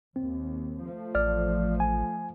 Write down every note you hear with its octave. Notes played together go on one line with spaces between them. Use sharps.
D#2 C4
F3 A3
A1 D5 F6
G#5